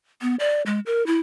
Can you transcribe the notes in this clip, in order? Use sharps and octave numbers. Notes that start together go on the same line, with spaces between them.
B3
D5
G#3
A#4
E4